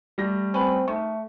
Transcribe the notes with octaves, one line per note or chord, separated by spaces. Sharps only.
G3 A3 A#6
C4 C#4 B4
D#3 A3 C#6